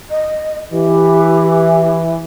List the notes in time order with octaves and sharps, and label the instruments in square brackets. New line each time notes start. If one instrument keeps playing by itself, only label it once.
[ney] D#5
[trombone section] E3 [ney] G4